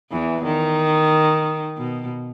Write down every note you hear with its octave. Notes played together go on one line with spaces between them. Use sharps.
E2 E3
D#3
B2